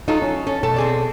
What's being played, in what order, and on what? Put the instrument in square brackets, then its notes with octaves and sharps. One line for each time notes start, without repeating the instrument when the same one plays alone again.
[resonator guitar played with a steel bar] F#3 F4 A4 [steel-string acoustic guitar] D#4
[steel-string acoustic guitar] C#4
[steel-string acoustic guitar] C#4 [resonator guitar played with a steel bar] A4
[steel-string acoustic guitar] B2 A4 A5 [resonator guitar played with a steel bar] A3
[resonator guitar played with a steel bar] C4 G#4 D5